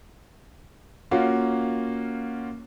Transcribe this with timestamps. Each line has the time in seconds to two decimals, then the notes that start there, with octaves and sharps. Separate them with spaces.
1.11 A#3 C#4 F4 F#4